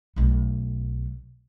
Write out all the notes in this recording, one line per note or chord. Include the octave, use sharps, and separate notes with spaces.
B1 A3